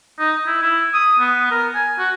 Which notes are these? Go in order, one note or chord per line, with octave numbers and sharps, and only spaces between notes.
D#4
E4
E4
D#6
B3
A#4
G#5
F#4